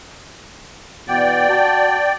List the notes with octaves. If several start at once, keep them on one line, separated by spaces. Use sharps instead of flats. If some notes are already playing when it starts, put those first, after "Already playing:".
B2 E3 D5 F#5 G5
F#4 A5